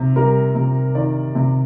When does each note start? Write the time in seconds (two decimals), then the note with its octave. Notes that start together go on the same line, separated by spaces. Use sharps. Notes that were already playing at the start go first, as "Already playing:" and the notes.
Already playing: C3
0.16 G3 A#4
0.55 C3
0.95 D#3 D5
1.35 C3